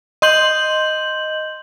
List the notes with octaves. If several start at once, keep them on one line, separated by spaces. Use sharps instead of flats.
D#5 C6 G6 F#7